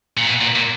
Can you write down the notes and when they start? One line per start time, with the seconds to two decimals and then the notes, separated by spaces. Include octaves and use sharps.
0.17 A#2
0.27 B2
0.41 A#2
0.55 A#2